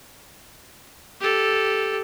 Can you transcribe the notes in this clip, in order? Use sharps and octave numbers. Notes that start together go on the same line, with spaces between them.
G4 A4